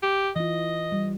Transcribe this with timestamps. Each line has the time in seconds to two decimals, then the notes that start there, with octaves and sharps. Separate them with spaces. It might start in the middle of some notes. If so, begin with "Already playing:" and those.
0.02 G4
0.36 E3 F4 D#5
0.92 G3